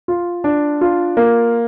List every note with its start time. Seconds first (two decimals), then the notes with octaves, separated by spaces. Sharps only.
0.08 F4
0.44 D4
0.81 F4
1.17 A#3